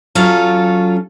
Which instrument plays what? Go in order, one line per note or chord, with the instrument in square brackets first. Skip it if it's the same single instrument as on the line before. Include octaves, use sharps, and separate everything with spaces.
[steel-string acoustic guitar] F#3 C#4 F4 A4